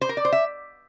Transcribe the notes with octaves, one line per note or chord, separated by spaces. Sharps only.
C5
A#4
D5
C5
E5